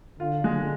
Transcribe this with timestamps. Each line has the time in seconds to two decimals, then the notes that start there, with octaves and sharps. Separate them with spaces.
0.19 D3 F4
0.44 G#3